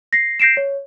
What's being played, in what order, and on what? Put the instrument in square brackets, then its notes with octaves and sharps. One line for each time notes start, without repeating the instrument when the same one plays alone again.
[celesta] A#6 C7
G6 A#6 C7 D7 E7
C#5